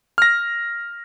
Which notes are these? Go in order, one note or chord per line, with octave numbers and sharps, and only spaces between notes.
F6 A#6